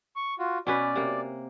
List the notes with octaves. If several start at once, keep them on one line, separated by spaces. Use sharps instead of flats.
C#6
F4 F#4
B2 C#4 B4 D5
C3 A#3